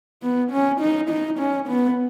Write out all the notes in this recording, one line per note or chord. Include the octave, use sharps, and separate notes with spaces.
B3
C#4
D#4
D#4
C#4
B3